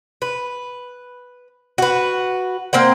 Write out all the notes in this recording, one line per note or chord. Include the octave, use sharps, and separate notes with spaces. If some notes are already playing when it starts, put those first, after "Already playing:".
B4
F#4 B4
A#3 C4 C5 F#5